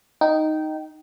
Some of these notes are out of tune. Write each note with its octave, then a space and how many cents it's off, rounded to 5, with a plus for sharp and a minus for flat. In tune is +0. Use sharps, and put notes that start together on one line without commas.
D#4 +0 G5 -20